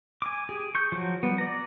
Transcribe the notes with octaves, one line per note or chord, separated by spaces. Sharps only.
G#5 D6
G4 G#4 G#5
C#6 G6
F3 F#3
G3 B3
D5 A#5